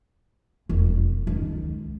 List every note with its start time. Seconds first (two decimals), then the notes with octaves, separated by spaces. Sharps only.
0.69 E1 F2
1.27 C#2 D#3